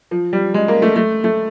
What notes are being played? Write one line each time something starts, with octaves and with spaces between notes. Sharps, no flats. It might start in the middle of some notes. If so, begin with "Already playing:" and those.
F3
G3
G#3
A#3
A3
A3
A3